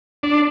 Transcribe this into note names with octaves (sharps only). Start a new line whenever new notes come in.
D4